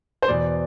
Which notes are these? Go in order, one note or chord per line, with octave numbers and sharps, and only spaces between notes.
C5
E2 B2 D5